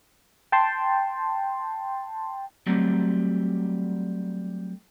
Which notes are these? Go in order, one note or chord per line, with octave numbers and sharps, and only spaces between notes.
G5 A5 C6
F#3 G3 A3 C4